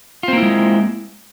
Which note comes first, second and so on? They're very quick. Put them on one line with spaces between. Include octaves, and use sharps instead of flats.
F4 C4 A#3 E4 G#3